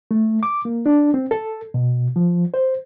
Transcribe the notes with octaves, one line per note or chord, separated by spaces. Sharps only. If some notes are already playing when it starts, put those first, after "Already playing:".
A3
D6
A#3
D4
C4
A4
B2
F3
C5